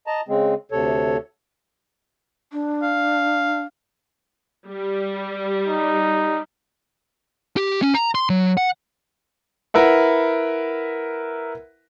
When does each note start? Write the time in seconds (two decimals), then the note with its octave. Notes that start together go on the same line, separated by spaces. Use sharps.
0.07 D#5 A5 A#5
0.28 C#3 G#3 C4
0.71 D2 C3 A4 C#5
2.52 D4
2.83 F5
4.67 G3
5.66 D#4
7.57 G4
7.82 C#4
7.95 A#5
8.15 C6
8.30 F#3
8.57 F#5
9.74 E4 A#4 B4 E5 F#5